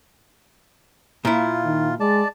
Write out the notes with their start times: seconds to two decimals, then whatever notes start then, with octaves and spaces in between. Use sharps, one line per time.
1.25 A#2 E4 F4
1.65 D#3
2.00 G#3 D5 A5